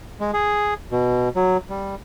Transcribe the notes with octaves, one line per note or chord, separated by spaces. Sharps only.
G#3
G#4
B2
F#3
G3